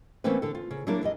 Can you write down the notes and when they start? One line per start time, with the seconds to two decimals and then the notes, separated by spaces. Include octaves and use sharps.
0.24 E3 A3 A#3 C4 C#4 B4
0.42 D3 A4
0.55 F4
0.71 C#3
0.87 F#3 G3 A#3 D4 E4 A#4
1.03 E2 G4 D#5